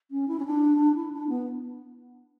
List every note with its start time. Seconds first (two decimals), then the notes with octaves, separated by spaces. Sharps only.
0.11 C#4
0.28 E4
0.40 C#4
0.45 D4
0.95 E4
1.13 D4
1.29 B3